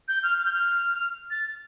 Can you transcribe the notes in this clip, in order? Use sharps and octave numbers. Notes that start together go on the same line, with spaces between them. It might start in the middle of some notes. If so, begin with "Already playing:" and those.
G6
F6
F6
G6
F6
A6